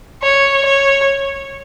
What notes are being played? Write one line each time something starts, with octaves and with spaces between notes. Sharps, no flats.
C#5
C#5